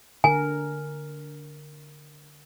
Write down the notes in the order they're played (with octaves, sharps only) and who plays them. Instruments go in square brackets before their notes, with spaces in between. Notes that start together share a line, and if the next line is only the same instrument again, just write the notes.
[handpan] D3 A#4 [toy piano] G#5